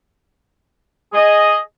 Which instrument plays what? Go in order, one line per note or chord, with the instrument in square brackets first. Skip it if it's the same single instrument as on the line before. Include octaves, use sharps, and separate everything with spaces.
[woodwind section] G#4 D#5